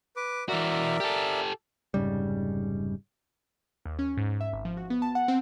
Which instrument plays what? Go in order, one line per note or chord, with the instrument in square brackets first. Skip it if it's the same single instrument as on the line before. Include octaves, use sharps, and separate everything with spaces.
[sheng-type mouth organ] B4 D6
[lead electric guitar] E3 F#4 [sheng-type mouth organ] A#4 D5 E5
[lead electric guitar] G4 A4
[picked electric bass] F1 G#2 C#3 G3
[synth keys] D#2
C#4
G#2
E5
G#1
F3
F#4
B3
A5
F#5
C4